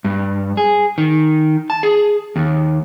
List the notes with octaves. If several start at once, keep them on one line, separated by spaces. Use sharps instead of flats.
G2
G#4
D#3
A5
G#4
D#2